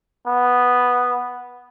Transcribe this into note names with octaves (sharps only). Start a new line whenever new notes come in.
B3